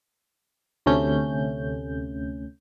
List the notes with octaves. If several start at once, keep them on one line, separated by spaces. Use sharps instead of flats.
D2 C3 A3 C#4 G6